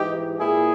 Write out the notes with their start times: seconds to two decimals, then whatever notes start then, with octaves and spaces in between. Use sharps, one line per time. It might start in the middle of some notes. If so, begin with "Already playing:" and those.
Already playing: G#2 E3 D#4 G4
0.39 A#2 E4 G#4